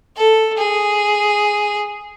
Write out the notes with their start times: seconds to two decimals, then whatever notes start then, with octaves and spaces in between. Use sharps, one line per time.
0.16 A4
0.58 G#4